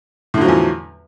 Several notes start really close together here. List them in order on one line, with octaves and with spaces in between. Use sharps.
A2 D3 F#3 F3 E2